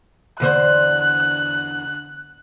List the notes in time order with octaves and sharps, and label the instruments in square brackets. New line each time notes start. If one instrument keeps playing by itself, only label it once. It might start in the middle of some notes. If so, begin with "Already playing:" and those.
[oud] E2 D3 C5 [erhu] F#6